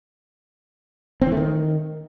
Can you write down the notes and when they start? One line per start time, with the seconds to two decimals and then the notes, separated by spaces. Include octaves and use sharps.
1.22 C4
1.27 E3
1.32 A3
1.37 D#3